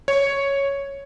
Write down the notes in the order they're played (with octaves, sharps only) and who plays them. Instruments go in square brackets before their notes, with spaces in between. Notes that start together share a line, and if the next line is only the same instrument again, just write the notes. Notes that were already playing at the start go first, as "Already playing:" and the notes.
[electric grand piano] C#5